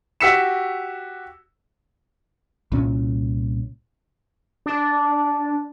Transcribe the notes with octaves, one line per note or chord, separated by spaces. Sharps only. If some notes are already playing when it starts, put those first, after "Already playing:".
F#4 G4 E6 B6 C#7 E7
C2 A#2 C#4
D4